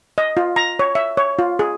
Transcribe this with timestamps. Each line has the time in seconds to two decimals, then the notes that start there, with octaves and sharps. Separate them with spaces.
0.18 D#5
0.37 F4
0.56 A#5
0.79 C#5
0.95 E5
1.17 C#5
1.39 F4
1.59 G#4